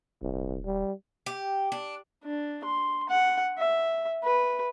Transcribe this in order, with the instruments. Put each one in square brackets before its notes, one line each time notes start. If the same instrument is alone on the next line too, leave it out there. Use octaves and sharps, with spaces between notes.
[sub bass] D#1 [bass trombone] C2
[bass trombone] G3
[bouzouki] G4
D4
[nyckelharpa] D4
C6
F#5
E5
B4